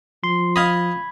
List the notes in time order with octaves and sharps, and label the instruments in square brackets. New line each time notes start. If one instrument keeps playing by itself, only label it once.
[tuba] F3 [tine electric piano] C6
[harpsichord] D#5 F5 [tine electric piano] B5 G#6